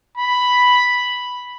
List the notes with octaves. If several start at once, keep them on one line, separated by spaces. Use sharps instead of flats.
B5